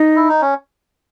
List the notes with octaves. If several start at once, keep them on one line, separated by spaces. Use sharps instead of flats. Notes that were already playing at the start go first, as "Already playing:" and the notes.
Already playing: D#4
E4
D#4
C#4